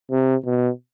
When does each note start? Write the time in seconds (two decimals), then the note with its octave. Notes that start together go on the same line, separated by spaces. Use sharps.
0.12 C3
0.46 B2